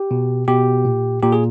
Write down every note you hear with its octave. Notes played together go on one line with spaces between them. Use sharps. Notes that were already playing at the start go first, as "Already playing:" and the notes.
Already playing: G4
B2
B2 G4
A#2
A#2 G4
G#4